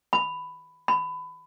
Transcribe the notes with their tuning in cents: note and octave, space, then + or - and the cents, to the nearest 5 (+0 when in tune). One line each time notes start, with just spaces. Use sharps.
B5 +10
B5 +25